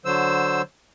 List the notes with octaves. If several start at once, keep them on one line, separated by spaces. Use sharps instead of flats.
D3 F#3 C5 E6